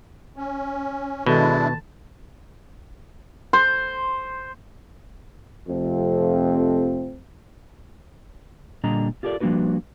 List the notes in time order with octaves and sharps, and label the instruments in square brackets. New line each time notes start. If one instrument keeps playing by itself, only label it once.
[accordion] C#4
[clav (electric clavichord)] B2 [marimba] D#3 A4 [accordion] G#3 D4 E4 [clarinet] A5
[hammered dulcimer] C5
[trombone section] F2 C3 F3 A3 C4
[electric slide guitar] A#2 D3 G3 D4 D#5 A#5
F4 G4 A4 A#4 D5
F3 G3 A#3 D4 F#4 B4